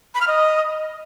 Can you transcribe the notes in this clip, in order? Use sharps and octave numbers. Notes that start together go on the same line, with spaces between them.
B5
F6
D#5